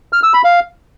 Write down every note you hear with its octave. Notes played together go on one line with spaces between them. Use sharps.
F6
E6
B5
F5